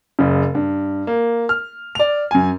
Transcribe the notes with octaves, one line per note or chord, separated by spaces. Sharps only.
F#1 C#3
G2
A#3
F6
D5 F7
F#2 G#5